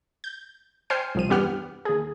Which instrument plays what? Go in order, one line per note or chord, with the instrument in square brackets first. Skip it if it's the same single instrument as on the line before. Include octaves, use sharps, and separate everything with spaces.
[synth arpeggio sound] G6
C5 G5 G#5 F6 C7 C#7
C2 F3 D#7
E2 G2 B3 G4 F#5 F6
D#2 G#4